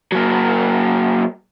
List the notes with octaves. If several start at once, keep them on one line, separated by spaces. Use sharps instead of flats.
F#3 A#3